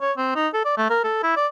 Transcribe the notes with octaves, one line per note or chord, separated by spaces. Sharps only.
C#5
C4
D#4
A4
D5
A3
A#4
A4
E4
D5